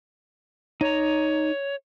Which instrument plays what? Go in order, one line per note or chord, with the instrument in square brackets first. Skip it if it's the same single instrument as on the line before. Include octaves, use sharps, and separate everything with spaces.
[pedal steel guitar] D#4 A#5 [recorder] C#5